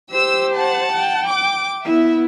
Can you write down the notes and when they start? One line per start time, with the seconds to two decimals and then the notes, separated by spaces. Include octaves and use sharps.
0.11 G4 C5 E6
0.54 F#5 A5
0.93 G5
1.26 D6
1.84 B3 E4 E5